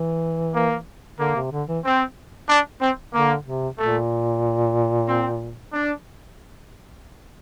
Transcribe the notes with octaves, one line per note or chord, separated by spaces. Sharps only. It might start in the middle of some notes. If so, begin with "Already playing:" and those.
Already playing: E3
A#3
D3 A#3
C3
D3
E3
C4
D4
C4
D3 A#3
C3
A#2 A3
C4
D4